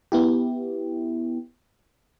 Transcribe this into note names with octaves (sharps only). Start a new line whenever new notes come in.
B3 E4 G4